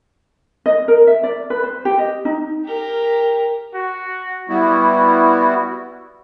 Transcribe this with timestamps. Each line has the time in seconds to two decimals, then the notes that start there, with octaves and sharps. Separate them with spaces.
0.66 D#5
0.88 A#4
1.07 E5
1.24 D5
1.50 B4
1.64 C5
1.85 G4
1.98 D#5
2.25 D#4
2.65 G4 A#4
3.74 F#4
4.49 G3 B3 E4 F#4